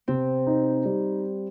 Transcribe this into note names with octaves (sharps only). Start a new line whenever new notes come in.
C3 C4
D#4
G3